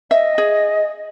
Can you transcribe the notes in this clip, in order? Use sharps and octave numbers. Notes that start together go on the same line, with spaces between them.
D#5 E5
G#4